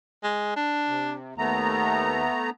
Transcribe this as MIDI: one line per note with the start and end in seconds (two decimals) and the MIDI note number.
0.24 0.54 56
0.56 1.15 62
0.87 1.34 48
1.38 2.26 39
1.38 2.50 57
1.38 2.50 59
1.38 2.50 82